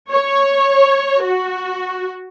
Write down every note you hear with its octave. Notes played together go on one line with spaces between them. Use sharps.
C#5
F#4